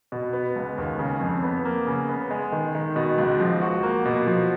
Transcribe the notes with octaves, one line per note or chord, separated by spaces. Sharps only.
B2
B3
C#2
D#2
C#3
F2
B3
A#3
C#3
B3
G#3
D#3
D#3
B2
C#2
F3
F#4
A#3
B2
F3